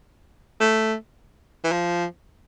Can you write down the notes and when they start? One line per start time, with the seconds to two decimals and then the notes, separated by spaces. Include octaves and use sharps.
0.61 A3
1.64 E3
1.72 F3